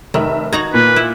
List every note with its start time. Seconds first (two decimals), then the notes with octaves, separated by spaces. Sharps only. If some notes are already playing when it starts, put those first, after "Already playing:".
0.14 F1 D#3 E5
0.53 D#4 F#4 A#5 G#6
0.74 A#2 B4
0.96 E4